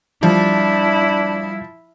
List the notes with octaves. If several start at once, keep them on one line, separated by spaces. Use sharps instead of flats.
F3 G3 D4 E4